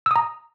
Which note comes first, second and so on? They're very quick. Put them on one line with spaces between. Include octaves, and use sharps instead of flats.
E6 D#6 A#5